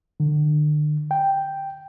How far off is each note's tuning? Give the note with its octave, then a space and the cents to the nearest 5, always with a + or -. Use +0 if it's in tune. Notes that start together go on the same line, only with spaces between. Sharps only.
D3 +40
G5 +0